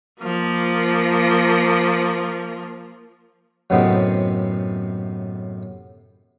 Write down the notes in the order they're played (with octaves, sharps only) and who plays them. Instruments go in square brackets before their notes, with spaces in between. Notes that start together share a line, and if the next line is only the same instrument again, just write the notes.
[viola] F3 A#3
[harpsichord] F#2 A2 C3 B3 C4 D#4